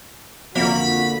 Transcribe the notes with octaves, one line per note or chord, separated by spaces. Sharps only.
F2 D3 A#3 F#4 B5